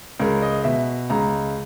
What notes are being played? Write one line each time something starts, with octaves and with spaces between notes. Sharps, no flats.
C#2 A#4
D#5
B2 E5
C#2 A#5